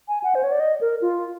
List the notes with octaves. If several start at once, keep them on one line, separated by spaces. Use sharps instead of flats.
G#5
F#5
C5
C#5
D5
D#5
A#4
F4